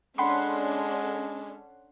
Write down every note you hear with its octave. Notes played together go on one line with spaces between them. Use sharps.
G#3 C#4 D4 A4 F#5 B5 C6